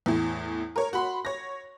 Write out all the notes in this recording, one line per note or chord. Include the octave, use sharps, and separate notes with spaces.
E2 A2
A#4 C#5
F#4 B5 C6
C#5 A#6